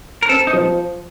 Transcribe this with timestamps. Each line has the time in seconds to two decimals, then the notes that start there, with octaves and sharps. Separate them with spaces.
0.22 A#4
0.29 C4 A4
0.47 D#4
0.53 F3